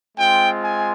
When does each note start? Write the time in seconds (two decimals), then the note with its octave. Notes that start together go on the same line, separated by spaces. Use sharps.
0.16 G#3 C4 F4 G5
0.63 G#5